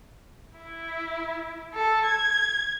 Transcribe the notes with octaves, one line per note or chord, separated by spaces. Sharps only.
E4
A4
G#6